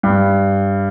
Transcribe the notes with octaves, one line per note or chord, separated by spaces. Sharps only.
G2